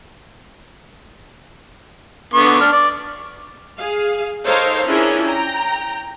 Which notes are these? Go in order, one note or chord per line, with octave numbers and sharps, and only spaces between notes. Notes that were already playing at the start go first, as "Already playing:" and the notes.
D3 B3 C#6
D4 F6
D5
G#4 F5
D#4 A4 A#4 C5 C#5 F5
C#4 D4 E4 F4 G#4 A#4
G5 A#5